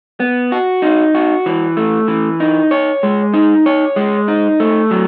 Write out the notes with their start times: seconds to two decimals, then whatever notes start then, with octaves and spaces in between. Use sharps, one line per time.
0.20 B3
0.52 F#4
0.82 D#4
1.15 F#4
1.46 E3
1.77 A3
2.08 E3
2.40 D#4
2.71 C#5
3.03 G#3
3.33 D#4
3.66 C#5
3.96 G#3
4.28 D#4
4.60 A3
4.91 F#3